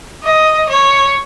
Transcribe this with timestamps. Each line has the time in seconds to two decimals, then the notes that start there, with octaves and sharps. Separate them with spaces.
0.23 D#5
0.68 C#5